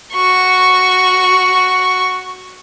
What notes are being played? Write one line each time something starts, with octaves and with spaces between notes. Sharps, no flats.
F#4 C#6